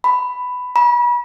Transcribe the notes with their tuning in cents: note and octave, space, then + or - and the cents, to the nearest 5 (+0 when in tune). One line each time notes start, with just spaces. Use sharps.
B5 +10
B5 -35